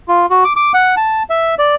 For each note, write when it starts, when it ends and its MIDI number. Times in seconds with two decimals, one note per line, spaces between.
0.08 0.26 65
0.30 0.44 66
0.44 0.53 86
0.56 0.72 86
0.74 0.95 78
0.97 1.23 81
1.30 1.55 76
1.59 1.75 74